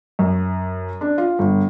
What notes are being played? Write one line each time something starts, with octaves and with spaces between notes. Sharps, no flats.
F#2
D4
F4
G1